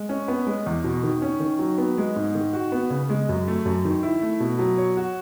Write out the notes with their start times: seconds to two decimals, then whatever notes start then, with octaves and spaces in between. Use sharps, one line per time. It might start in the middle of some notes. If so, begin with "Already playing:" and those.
Already playing: G#3
0.09 C#4
0.28 B3
0.47 G#3
0.66 E2
0.84 B2
1.03 D#3
1.22 C#4
1.40 D#3
1.59 F#3
1.78 B3
1.98 G#3
2.16 G#2
2.35 D#3
2.53 F#4
2.72 B3
2.90 C#3
3.10 G#3
3.29 F#2
3.48 A3
3.65 F#2
3.85 D#3
4.03 E4
4.21 A3
4.40 B2
4.59 F#3
4.78 C#5
4.97 F#4